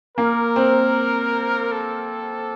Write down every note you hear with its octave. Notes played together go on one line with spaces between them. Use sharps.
A#3 A#4
C4
A4